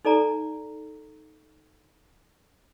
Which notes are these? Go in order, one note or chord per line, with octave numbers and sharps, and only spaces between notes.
D#4 A4 D5 A#5